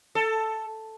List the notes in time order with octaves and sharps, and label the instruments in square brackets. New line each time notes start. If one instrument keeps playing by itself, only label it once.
[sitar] A4